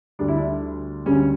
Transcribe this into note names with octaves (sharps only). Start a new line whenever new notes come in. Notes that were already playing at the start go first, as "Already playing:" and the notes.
D2 D3 G3 D4
E4
D4
D2 C#3 G3 C#4